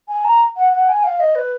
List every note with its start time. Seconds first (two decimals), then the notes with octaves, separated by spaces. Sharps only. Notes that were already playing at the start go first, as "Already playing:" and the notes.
0.08 G#5
0.25 A#5
0.56 F#5
0.73 F#5
0.89 G#5
1.04 F5
1.20 D#5
1.35 B4